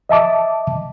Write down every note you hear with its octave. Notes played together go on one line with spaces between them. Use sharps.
D#5 E5 A5 D6